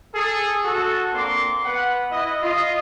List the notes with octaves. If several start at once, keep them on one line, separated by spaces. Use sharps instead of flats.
G#4 A4
F#4 A4
A#3 C4 D4 C6 D6
B3 B4 F#5
E4 D#5
F4 D#5